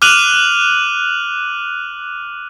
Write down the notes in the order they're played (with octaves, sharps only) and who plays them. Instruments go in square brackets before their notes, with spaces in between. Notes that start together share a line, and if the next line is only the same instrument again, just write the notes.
[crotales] D6 F6 F#6 D#7 F7 F#7